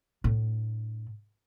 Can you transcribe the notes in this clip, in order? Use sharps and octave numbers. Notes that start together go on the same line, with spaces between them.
A2 D4